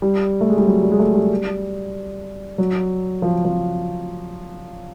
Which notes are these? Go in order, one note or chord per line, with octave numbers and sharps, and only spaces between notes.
G3
A3
G#3
G3
F#3
G3
G#3
A3
G3
F#3
F3
F3